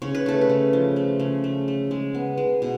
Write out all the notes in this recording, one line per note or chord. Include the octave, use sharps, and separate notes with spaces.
C#3 C#5
B4
A3 A4
B4
C#3
F3
A3
C#3
A3
A3
G#3
B3
G#3
B2